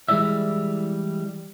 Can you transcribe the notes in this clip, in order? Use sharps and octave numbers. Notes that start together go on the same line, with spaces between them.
E3 G3 G#3 E4 D5 E5